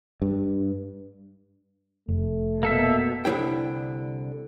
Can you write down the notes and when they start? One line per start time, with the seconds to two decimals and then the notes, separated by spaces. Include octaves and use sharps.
0.22 G2
2.08 F1 A3
2.63 B2 A#3 A4 E5
3.25 C2 D3 F#3 E4 G5